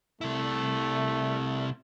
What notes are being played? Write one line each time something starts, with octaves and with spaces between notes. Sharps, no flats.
C3 A3 E4